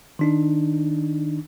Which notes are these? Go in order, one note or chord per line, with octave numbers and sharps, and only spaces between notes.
D#3 D4 D#4